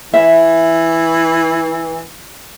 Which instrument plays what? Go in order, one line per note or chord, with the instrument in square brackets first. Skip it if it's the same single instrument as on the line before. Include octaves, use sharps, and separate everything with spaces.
[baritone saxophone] E3 [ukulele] E5